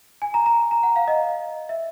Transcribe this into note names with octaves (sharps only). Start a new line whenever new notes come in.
G#5
A#5
A#5
A#5
F#5
F5
D#5
E5